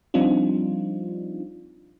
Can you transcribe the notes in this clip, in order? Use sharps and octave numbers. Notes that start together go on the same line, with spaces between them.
F3 G3 C4 D4 D#4 F4